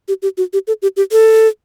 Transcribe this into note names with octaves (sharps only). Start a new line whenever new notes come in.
G4
G4
F#4
G4
A4
G4
G4
A4